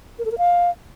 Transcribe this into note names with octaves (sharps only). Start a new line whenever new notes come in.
A#4
A4
A#4
F5